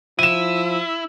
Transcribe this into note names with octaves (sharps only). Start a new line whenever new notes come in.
F3 E4 D#7 E7